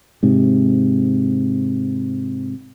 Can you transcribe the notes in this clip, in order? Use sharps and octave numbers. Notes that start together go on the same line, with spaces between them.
G#2 C3